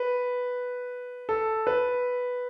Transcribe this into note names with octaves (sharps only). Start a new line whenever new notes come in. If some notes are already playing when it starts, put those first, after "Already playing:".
Already playing: B4
A4
B4